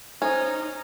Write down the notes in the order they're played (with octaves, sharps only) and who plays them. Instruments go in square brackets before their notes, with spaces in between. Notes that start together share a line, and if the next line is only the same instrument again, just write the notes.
[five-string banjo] C#4 [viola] D#4 [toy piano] A4 C5